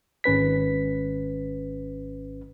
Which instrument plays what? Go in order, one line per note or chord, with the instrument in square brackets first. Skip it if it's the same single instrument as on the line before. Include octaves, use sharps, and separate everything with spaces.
[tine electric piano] G#1 C#4 B4 B6